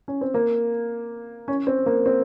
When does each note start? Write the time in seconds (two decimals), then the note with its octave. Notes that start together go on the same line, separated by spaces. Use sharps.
0.08 C#4
0.21 C4
0.34 A#3
1.48 C#4
1.67 C4
1.86 A#3
2.06 C4